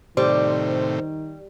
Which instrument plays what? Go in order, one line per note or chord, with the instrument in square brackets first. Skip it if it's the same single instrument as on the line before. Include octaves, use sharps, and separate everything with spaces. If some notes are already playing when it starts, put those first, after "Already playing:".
[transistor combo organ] A2 C3 [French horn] D#3 [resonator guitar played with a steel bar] G3 [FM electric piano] C5